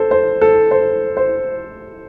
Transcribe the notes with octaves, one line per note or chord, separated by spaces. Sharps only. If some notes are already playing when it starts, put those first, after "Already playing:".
Already playing: A4 C5
C5
A4
C5
C5